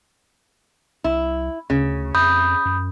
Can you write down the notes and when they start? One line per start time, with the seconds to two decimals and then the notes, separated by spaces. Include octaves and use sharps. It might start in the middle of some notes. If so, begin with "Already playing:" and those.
1.04 C2 E4
1.70 D2 C#3
2.15 F2 B5 D#6 G6
2.65 F#2